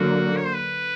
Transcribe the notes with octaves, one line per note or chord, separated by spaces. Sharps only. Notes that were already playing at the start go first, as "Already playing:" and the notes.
Already playing: D3 F#3 A#3 F#4
C#5
C5
B4